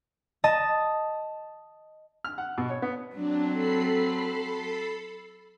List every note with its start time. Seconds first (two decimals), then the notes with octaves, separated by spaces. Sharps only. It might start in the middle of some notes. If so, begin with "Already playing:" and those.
0.44 D#5 A5
2.24 F6
2.38 F#5
2.58 B2
2.70 C#5
2.82 B3
3.15 F#3 C4 D4
3.53 A4 B5 C7